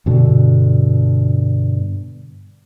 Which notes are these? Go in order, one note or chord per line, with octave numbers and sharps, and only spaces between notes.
G2 B2 D3